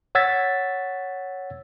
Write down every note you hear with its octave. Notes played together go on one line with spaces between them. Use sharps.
C#5 F#5 E6 G#6 A6 B6